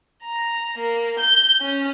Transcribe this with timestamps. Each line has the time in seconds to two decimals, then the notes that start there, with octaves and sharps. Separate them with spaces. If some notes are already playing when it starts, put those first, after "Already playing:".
0.24 A#5
0.79 A#3
1.20 G6
1.62 C#4